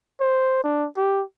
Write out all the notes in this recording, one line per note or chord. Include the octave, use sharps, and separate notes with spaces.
C5
D4
G4